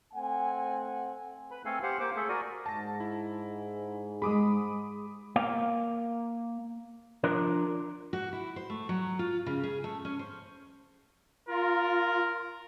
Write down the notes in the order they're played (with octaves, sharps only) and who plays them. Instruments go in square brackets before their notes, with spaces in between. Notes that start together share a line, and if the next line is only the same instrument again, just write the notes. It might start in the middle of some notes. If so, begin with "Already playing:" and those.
[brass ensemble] A3 C4 F#5 G#5
[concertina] B4 B5
A3 C4 A4 F5 G#5
G4 C5 F5 F#5
A#3 C5 D6
A3 G#4 A4 E5
F#4 A#4 D5 D#6
[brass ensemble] G#2 [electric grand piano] A5 A#6
[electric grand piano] E4
[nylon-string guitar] G#3 G#4 [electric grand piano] B5 D6 D#6
[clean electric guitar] A#3 F5
F3 D4 A#4
[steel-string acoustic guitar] F#4
E4
C5
A3
F#3
F4
C#3
G#4
A3
C#4
C5
[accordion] F4 [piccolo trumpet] A#4